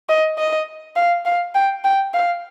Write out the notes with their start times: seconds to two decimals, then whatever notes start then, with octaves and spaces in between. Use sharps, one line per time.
0.10 D#5
0.38 D#5
0.96 F5
1.26 F5
1.55 G5
1.84 G5
2.14 F5